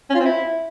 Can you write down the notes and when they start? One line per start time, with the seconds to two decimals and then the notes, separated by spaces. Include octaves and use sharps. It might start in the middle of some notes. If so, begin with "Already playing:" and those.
0.09 C#4
0.15 F4
0.20 C4
0.25 E4